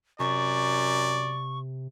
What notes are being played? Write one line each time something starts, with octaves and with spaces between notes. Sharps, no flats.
F#2 C3 D5 C#6